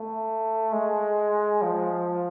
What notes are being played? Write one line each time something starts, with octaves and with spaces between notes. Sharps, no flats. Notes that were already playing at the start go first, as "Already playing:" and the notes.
Already playing: A3
G#3
F3